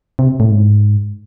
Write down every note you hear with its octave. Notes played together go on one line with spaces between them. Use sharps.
C3
A2
G#2